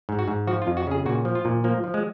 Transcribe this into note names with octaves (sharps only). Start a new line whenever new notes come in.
G#2
F#4
G#2
F3 F#4
F4
F2
F#4
C#3 G#4
A#2 F#4
F3
F4
A#2
F3 A#3
F3
G#3